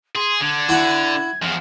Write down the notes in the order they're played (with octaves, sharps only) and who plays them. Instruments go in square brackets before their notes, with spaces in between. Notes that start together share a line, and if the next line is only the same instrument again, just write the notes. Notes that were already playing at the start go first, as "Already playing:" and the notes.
[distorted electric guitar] G#4 [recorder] C6
[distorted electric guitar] D3 [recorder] G#6
[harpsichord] E4 F#4
[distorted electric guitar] E2 F3